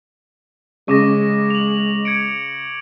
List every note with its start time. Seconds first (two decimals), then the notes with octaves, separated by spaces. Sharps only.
0.88 C#3 G#3 C#6 D6 A#6
1.50 F7 F#7
2.05 G#6 C#7 D7